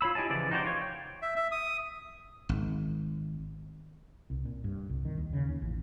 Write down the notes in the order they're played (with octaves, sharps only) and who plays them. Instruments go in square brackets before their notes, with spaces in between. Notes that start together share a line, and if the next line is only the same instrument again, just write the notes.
[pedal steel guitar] F4 C#5 B5 E6
E4 G4 D#5 G#5 A5
C#3 E3 F3 D5
D#4 F#4 G4 C5 D5
F4 C#5
G5
[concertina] E5
E5
D#6
[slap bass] G#1
[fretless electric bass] C2
A#2
G2
C2
D#3
D#2
C#3
D#2
A1